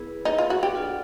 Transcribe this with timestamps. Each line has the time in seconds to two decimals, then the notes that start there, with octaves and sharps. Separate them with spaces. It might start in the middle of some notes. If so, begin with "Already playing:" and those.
Already playing: B3 E4 G#4 B4
0.25 D#4
0.38 F4
0.50 F#4
0.63 G4
0.74 D4 F4 A4 D5 F#5